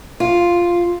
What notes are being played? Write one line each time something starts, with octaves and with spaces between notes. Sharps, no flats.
F4